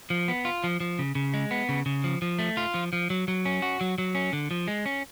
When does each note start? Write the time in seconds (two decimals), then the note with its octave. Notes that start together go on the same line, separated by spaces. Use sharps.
0.10 F3
0.28 B3
0.45 F4
0.64 F3
0.80 F3
0.99 C#3
1.15 C#3
1.34 G#3
1.51 B3
1.69 C#3
1.86 C#3
2.04 F3
2.22 F3
2.39 A3
2.57 F4
2.74 F3
2.93 F3
3.10 F#3
3.28 F#3
3.45 C#4
3.62 F#4
3.81 F#3
3.98 F#3
4.15 C#4
4.33 D3
4.51 F3
4.68 G#3
4.86 C#4